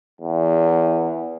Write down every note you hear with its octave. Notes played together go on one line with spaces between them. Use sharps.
E2